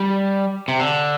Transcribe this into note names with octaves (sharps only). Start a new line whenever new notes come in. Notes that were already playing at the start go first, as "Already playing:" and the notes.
Already playing: G3
C3
D3